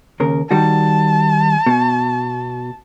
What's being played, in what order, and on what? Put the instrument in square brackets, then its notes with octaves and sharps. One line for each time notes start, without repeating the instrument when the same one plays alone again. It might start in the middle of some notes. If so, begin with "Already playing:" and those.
[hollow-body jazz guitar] D#2 C#3 A#4
[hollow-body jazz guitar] D#3 G3 F#4 [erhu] A5
[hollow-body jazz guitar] B2